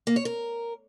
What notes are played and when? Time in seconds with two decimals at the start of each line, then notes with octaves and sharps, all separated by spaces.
0.07 A#3
0.16 C#5
0.25 A#4